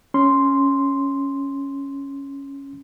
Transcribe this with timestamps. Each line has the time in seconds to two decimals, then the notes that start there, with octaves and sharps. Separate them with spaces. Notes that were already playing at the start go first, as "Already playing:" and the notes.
0.14 C#4 C6